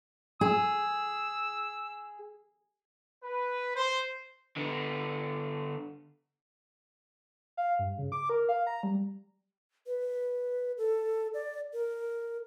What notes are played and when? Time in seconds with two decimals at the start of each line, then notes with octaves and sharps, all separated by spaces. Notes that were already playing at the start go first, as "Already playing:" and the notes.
0.41 G#4 E6
3.23 B4
3.75 C5
4.56 D3 B3
7.57 F5
7.79 G2
7.98 C#3
8.12 D6
8.30 A#4
8.49 F5
8.67 A#5
8.83 G3
9.87 B4
10.78 A4
11.34 D5
11.73 A#4